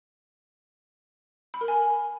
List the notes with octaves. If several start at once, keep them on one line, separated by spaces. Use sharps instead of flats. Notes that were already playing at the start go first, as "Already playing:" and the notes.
B5
A#4
G#5